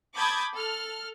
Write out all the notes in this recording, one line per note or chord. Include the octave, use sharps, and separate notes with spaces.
A5 B5 D6 D#6 G6 G#6
A4 F6